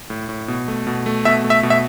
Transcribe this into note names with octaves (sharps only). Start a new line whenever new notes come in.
A2
A2
B2
A3
B2
A3
B2 E5
A3
E5
B2
E5